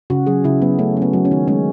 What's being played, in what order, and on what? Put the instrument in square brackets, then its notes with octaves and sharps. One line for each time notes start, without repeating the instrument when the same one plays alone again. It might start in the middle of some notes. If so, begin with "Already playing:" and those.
[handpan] C#3 F#4
F#3 G#4
C#3 E4
F#3 B3
A3 C#4
A3 B3
F#3
C#4
D#3
G#3 C#4